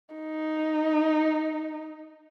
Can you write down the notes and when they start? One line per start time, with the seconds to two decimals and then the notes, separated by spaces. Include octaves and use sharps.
0.16 D#4